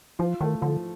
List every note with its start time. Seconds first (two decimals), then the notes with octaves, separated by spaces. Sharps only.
0.19 F3 F4
0.41 D#3 A3
0.61 D3 F3